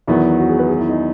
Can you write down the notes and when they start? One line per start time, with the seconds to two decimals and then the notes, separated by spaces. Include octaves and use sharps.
0.07 E2 D#3 F#3 B3 E4
0.39 F#4
0.49 G#4
0.59 B4
0.68 G#4
0.79 E4
0.89 D#4